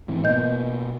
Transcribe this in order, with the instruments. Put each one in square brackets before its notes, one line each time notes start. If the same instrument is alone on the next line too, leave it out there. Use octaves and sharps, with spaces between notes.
[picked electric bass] G#2 E3 C4
[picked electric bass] B2 A#3 [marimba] D#5 G6